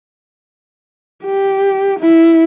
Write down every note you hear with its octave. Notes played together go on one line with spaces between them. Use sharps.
G4
E4